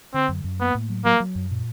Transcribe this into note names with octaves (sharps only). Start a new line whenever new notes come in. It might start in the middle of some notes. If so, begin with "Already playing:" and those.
D3 C4
F#2
F#2
A#3 B3
A2
F#3
F#3 A#3
F#3
F#2
A#2